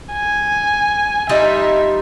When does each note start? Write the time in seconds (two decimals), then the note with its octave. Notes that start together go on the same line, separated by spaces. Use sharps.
0.13 G#5
1.29 G3 D#4 F4 E5